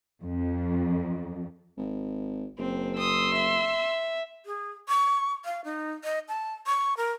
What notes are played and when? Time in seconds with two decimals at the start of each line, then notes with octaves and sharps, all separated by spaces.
0.22 F2
1.77 G#1
2.58 F#1 C4
2.98 C6 D#6 E6
3.33 E5
4.46 G#4
4.88 C#6
5.45 F5
5.65 D#4
6.04 D#5
6.28 A5
6.67 C#6
6.97 A#4